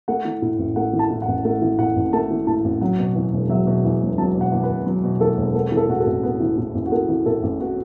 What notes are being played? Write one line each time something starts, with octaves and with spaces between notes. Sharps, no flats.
A3 F#5
E3
A2
A1
A3 F#5
E3
A5
A2
F#5
A1
A3 F#5
E3
A2 F#5
A1
A3 A5
E3
A2 A5
A1
F#3 F#5
B2
E2
E1
F#3 E5
B2
E2
E1
F#3 A5
B2
F#5
E2
B4
E1
F#3 B4
B2
E2 A4
E1
B3 A4
E3
A4
A2 F#4
A4
A1
B3
E3
A2
A1
F#4
B3 A4
E3
A2 A4
A1
B3 F#4